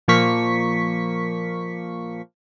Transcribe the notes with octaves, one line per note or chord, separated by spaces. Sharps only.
A#2 F3 A#3 C#6 B6